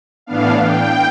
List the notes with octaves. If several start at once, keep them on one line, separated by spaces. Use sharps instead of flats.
A2 E3 B3 D4 F5
G5